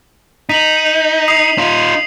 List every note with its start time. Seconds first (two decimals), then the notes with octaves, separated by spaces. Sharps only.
0.49 D#4 B6 D#7 F#7
1.28 D#6 C7 F7
1.58 D#4 F4